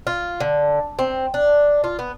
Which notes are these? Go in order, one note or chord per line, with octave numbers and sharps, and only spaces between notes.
F4
D3
C4
D4
F4
B3